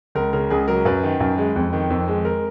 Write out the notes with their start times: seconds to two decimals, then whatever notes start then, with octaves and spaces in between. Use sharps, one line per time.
0.15 C#2 A#4
0.33 C#3 A#4
0.50 C#2 G#4
0.68 F#3 A#4
0.85 F#2 B4
1.03 D#3
1.20 F#2
1.38 G#3
1.56 F2
1.73 D#3
1.90 F2
2.08 G#3
2.25 A#4